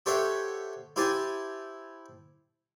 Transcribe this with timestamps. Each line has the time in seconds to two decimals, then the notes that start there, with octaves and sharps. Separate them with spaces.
0.06 G4 A4 C5 C#5 E5 F#5
0.96 E4 G4 C5 G#5 A5